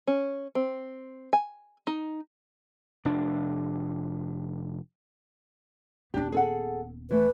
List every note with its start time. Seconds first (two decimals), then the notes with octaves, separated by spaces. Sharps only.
0.07 C#4
0.55 C4
1.33 G#5
1.87 D#4
3.05 F1 D4
6.14 D#1 B3 D4 G4
6.32 G#4 A4 F#5
7.11 E3 A3 B4